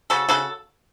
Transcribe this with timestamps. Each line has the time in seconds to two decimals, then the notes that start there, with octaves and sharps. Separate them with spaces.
0.10 C#3 F#4 A4
0.29 C#3 F#4 A4